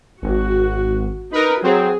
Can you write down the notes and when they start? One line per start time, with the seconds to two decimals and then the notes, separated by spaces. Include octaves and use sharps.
0.22 G#1 F#4
1.32 D#4 A#4 B4
1.62 F#3 C4 G#4